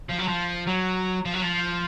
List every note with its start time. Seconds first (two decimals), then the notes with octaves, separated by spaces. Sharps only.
0.10 F3
0.19 F#3
0.28 F3
0.67 F#3
1.25 F3
1.34 F#3
1.42 F3